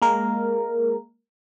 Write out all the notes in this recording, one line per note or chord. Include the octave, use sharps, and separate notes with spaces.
G#3 A#3 A#4